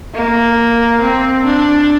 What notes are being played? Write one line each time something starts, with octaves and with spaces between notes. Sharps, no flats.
A#3
C4
D4